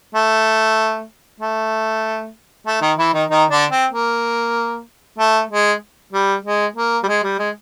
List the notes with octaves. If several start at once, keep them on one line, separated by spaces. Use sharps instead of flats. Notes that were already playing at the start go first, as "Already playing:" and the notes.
A3
A3
A3
D#3 D#4
E3 E4
D#3 D#4
D#3 D#4
D3 D4
C4
A#3
A3
G#3
G3
G#3
A#3
G3
G#3
G3
G#3